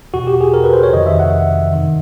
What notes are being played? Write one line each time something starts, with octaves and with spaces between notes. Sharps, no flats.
E2 B2 F#4
G4
G#4
A#4
B4
C5
C#5
F2 C3 D#3 D#5
E5
F#5
F#2 D#3